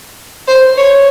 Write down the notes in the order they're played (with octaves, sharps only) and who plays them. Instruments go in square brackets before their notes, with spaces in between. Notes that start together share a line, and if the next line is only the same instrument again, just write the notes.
[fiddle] C5
C#5